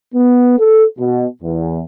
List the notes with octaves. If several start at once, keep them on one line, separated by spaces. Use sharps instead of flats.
B3
A4
B2
E2